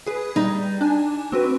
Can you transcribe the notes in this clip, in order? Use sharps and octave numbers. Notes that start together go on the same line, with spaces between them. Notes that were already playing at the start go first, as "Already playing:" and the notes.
G#4 B4
G3 D#4
D4 G#5
C4 F#4 B4